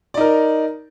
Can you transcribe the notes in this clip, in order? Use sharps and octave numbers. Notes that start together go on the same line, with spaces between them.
D#4 A#4 D5